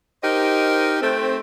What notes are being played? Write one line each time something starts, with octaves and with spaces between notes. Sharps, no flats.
D#4 G4 A#4 C5 D#5
A3 C4